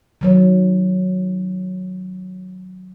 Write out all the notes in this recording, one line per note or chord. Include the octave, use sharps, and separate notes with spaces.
D#3 F#3 C#5